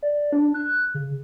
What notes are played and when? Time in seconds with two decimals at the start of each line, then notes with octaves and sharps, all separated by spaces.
0.03 D5
0.33 D4
0.54 F#6
0.94 C#3